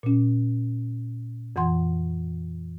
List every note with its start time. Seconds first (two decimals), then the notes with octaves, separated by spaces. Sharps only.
0.03 A#2 C#4
1.56 F2 E3 F#5 C6